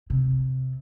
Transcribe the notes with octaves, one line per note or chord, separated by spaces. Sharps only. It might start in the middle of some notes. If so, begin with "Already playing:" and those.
C3